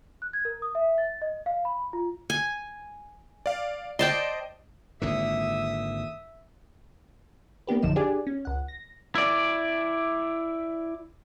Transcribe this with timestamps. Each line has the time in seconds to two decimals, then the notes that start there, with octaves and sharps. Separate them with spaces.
0.22 F#6
0.33 G#6
0.45 A#4
0.62 D#6
0.75 E5
0.98 A6
1.22 D#5
1.46 F5
1.65 B5
1.93 F4
2.30 G#5
3.46 D5 F5
3.99 C5 D5 D#5 G5 A5 C6
5.02 G#1 A#2 D3 E5 D#6
7.67 A#3 B3 D4 G4 B4
7.82 A1 F#2 D3 F3 D#4 E7
7.96 D4 G4 G#4 D5 G#5
8.27 C#4
8.45 C#2 F#5
8.68 A#6
9.15 E4 D5